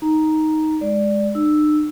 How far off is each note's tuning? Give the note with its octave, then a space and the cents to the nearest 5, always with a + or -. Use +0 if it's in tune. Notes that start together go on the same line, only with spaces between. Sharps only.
D#4 +5 A#5 +0
G#3 +0 D5 +0
D#4 -45 E6 +0